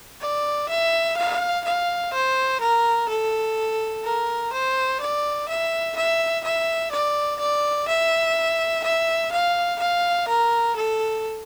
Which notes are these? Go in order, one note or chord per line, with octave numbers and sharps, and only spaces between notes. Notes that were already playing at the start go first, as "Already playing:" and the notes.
D5
E5
F5
F5
C5
A#4
A4
A#4
C5
D5
E5
E5
E5
D5
D5
E5
E5
F5
F5
A#4
A4